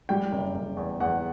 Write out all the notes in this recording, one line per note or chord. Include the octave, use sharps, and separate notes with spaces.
G3 G5
F#1
F#1
E2
E2 F#5